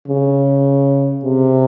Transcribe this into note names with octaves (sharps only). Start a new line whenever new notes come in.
C#3
C3